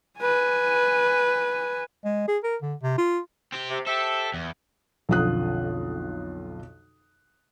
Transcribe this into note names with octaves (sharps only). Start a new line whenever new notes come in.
B4 G#5
G#3
G#4
A#4
D3
C3
F4
C4 G4
C3
G4 A4 C5 E5
E2
B1 F2 D3 F4 D#6 F#6